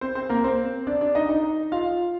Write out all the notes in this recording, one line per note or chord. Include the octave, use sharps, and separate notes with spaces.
C4 C5
C4 C5
A#3 A#4
C4 C5
D4 D5
D4 D5
D#4 D#5
D#4 D#5
F4 F5